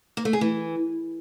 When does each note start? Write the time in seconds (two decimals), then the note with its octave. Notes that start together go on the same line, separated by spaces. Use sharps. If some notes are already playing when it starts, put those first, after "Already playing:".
0.17 A#3
0.25 A3
0.33 G#4
0.41 E3